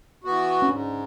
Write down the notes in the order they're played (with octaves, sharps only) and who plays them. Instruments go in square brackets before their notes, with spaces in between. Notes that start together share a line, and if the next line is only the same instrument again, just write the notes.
[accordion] E3 B3 F#4
[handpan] C#4
[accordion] G#2 [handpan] D4